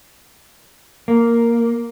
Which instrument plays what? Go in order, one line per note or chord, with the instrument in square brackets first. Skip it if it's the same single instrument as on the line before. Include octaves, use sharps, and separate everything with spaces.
[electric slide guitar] A#3